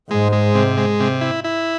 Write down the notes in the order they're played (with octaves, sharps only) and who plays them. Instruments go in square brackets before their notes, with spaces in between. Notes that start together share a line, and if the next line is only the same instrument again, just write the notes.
[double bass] G#2 [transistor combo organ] G#3
[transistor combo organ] G#3
C3
G#3
C3
E4
E4